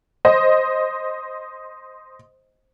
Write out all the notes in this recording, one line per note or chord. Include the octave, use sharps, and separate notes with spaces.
C5 D#5